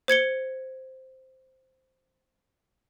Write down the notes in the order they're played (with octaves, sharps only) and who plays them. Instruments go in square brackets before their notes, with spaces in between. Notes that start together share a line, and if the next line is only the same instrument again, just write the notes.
[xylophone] C5 G#6 C#7 G7